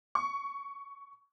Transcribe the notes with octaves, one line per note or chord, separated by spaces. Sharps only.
C#6